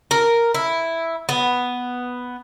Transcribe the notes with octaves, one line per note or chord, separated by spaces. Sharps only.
A#4
E4
B3